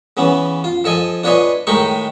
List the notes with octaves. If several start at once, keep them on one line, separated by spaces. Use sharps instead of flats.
C#3 E3 B3 C#4
F4
F3 A4 D#5 G#5
D4 F4 B4 C#5 D#5 G#5
A2 D#3 G#3 D#4 B5 C#6